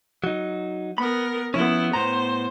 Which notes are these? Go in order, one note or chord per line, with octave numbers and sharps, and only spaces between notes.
F#3 D#4
B3 A#4 B5
F3 B3 C#4 E4
A2 B3 C5 A#5